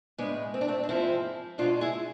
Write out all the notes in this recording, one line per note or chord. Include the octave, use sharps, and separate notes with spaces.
A2 G#3 B3 D4
C4
D4
A3 C4
D4
G#2 F3 G#3 C4 E4
B2 G#3 D4 F4
E4 G#4